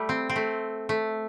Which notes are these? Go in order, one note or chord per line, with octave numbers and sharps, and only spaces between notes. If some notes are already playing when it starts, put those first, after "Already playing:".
Already playing: G3 A3
C4
C4
A3
A3